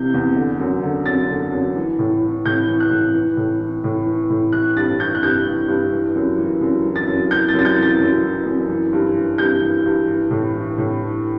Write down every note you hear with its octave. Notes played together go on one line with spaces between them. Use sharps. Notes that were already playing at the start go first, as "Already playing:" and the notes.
Already playing: C3 E3 G6
E2
D3
F#2
D3
F#2 A6
D3
F#2
E3
A2
E3
A2 G6
E3
F#6
A2
E3
A2
E3
A2
E3
A2
E3 F#6
G2 A6
E3 G6
F#6
G2 G6
E3
G2
E3
F#2
E3
F#2
E3
A6
F#2
E3 G6
A6
F#2
A6
G6
E3
A6
F#2
E3
F#2
E3
G2
E3
G2 G6
E3
G2
E3
A2
E3
A2
E3